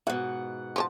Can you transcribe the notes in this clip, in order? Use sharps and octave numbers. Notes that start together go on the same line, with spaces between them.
G#2 B2 F#5
F3 C#5 A5